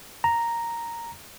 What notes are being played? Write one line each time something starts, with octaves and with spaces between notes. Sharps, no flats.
A#5